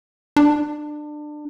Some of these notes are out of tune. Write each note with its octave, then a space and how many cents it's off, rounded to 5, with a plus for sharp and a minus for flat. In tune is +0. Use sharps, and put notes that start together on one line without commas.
D4 +25